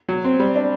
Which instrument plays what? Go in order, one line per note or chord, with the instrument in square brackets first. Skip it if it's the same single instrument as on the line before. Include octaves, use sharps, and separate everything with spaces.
[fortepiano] F#3
C4
G3
D4